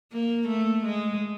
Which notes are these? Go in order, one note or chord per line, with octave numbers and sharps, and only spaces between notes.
A#3
A3
G#3